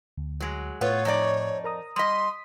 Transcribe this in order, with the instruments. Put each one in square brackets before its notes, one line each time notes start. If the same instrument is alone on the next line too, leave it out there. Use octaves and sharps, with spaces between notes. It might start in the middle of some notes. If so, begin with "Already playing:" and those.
[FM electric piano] D2
[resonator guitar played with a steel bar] F#3 G#3
[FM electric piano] A2 [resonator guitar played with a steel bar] A3 B3 F4 [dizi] C#5
[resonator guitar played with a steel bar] F2 D#4 D5
[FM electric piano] A#4 A#5 D#6
[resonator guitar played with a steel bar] G3 D#5 [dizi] C6 [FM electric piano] D#6 B6